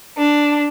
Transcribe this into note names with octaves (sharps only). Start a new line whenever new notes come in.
D4